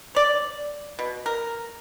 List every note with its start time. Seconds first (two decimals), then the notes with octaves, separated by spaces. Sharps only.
0.15 C#5 D5
0.99 B2
1.26 A#4